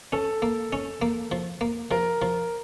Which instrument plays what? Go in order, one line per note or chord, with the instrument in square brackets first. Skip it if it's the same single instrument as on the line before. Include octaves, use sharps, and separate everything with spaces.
[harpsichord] C#4 [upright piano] A4
[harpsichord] A#3
C#4
A#3
F3
A#3
[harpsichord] F3 [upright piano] A#4
[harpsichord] F3